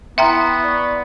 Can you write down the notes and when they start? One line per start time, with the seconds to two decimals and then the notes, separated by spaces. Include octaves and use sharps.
0.18 B3 E4 E5 G5 A#5 C6
0.64 D5 C#6